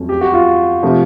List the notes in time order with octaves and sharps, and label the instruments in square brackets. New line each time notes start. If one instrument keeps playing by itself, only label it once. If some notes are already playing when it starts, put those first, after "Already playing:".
Already playing: [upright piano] F2 F#3 A3 C#4
[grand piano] G4
F#4
F4
[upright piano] C3 F3 A3